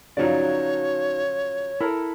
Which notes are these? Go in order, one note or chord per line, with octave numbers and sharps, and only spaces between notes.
C#3 F3 F#3 D#4 F#4 C#5 D5
E4 A4 A#4